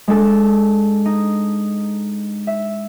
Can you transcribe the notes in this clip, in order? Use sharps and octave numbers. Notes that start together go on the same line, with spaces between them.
G#3 D4 A4 A5 E6
D#4
E5